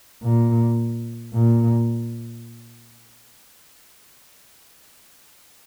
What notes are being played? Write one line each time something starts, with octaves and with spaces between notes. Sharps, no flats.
A#2
A#2